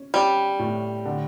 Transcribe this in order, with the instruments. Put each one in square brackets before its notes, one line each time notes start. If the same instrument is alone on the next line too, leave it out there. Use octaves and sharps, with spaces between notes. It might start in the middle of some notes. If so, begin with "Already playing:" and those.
Already playing: [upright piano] C#4
[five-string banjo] G3 [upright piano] C#4
[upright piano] A2
D3